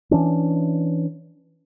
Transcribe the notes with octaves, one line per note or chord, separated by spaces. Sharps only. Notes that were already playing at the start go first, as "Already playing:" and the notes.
E3 C#4 D4